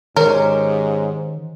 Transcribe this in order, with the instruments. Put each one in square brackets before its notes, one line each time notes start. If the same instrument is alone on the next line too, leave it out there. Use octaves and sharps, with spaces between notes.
[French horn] G#2 [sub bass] D#3 [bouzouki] C#4 G4 C5 [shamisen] A#4